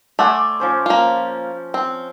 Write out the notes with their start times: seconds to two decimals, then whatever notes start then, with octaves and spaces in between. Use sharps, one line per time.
0.19 A3 D5 F#5 G#5 C6
0.60 F3 C#4 C5
0.86 A#3 F4
1.74 C4